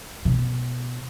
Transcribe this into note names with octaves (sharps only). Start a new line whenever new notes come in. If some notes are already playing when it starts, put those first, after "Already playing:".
B2